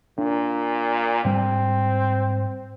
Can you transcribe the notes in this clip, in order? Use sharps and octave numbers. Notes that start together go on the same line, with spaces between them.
A#2 D4
G#2 G3 C4